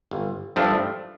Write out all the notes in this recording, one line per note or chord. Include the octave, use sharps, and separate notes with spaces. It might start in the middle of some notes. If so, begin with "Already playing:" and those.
G1
G2 F3 A3 D4